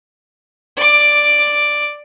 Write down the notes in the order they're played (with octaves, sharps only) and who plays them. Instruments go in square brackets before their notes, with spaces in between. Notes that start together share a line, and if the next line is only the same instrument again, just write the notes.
[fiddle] D5 D6